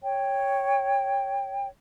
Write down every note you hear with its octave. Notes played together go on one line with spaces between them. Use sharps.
C#5 G5